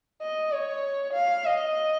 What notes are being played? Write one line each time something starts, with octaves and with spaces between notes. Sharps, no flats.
D#5
C#5
F5
D#5